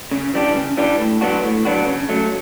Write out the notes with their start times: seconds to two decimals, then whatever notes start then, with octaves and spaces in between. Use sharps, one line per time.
0.11 C#3
0.34 E3 G3 D4 G4
0.55 C#3
0.77 E3 G3 D4 G4
0.99 A2
1.21 F#3 B3 D4 F#4
1.43 A2
1.65 F#3 B3 D4 F#4
1.87 C#3
2.09 F#3 A3